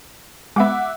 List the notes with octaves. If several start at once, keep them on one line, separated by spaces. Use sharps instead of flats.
G#3 B3 E5 F#5 D6